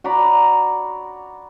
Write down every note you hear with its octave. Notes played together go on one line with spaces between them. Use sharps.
F#4 D5 A#5 B5